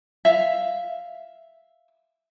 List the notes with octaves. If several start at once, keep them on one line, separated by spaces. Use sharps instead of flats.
E5 F5